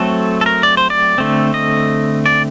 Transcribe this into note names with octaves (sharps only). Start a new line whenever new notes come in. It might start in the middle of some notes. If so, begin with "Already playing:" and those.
Already playing: F#3 A3 C4 A4
A4
A#4
D5
C5
D5
D3 A3 C4
D#5
D5